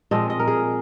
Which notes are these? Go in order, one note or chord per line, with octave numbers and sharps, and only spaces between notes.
A#2 F3 G#3 C4 D#5
D#5
A#4
G#4